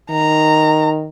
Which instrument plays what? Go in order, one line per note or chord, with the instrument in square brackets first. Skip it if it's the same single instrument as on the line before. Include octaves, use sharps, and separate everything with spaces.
[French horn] D#3 [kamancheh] A#5